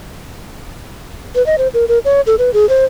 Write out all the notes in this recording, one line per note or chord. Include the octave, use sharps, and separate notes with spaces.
B4
D#5
C5
A#4
A#4
C#5
A4
B4
G#4
C5